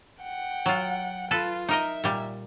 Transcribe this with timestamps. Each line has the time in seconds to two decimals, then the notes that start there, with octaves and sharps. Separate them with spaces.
0.23 F#5 G5
0.66 F#3 F4
1.31 F4 A4 B4
1.69 D#4 A#4 D#5 E5
2.04 A#2 G3